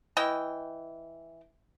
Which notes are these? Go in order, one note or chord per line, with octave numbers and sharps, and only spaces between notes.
E3 D#5 G5